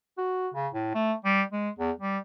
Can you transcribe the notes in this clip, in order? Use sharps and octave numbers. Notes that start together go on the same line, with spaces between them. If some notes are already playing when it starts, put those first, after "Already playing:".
F#4
C#3
A2
A3
G3
G#3
E2
G3